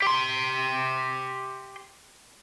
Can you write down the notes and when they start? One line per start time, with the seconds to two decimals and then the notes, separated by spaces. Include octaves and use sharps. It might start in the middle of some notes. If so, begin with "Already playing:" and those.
0.02 G4 C6